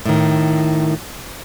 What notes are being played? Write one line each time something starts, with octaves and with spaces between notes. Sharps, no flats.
A2 D#3